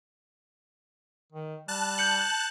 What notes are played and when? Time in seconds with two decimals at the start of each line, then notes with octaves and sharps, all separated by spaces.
1.32 D#3
1.68 G3 A5 F#6
1.98 G6 C#7 F#7